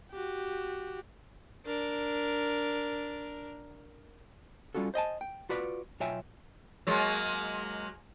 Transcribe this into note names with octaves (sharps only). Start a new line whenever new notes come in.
F#4 G4
D4 A#4
G3 C#4 F4 F#4 A4
C5 D#5 G#5 A5
G5
F4 F#4 B4 D5 B5
B1 F4 C#5 E5 G5 G#5
F#3 G#3 A#3